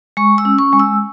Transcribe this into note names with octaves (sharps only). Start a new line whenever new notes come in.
G#3 C#6
E6
C#4
C#6
G#3
E6